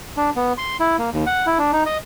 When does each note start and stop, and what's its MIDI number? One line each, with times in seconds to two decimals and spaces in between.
0.17 0.30 62
0.36 0.53 59
0.58 0.77 84
0.80 0.96 64
0.98 1.10 58
1.13 1.25 39
1.26 1.46 78
1.47 1.58 64
1.58 1.71 62
1.73 1.83 63
1.86 1.98 75